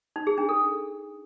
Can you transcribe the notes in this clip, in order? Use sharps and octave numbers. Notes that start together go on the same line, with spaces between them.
D#4
G#4
D4
A4